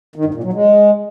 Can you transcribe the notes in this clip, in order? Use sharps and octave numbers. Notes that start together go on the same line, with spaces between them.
D#3
G2
A#2
F#3
G#3